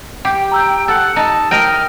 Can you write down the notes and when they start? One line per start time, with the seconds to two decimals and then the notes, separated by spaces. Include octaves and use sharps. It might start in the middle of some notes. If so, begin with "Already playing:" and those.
0.25 G4 G5
0.52 A#5 E6 G6
0.88 A4 F#5 E6
1.16 D#4 A5
1.51 A#4 D#5 G5 F6